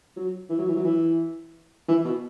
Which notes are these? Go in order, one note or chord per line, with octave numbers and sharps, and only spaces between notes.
F#3
E3
F#3
E3
F#3
E3
E3
B2